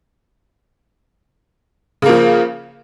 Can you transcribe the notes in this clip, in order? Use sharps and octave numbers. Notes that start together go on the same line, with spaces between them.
C#3 F3 A#3